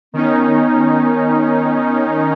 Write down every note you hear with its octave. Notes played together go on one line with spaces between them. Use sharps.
D#3 B3 C#4 D#4